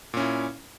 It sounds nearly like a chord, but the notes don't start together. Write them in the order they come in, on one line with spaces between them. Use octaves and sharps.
A#2 C#4 E4